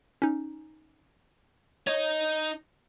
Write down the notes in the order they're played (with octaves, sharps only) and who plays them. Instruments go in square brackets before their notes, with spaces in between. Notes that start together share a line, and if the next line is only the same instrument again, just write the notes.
[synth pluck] C#4 D#4
[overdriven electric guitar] D#4 [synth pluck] C#5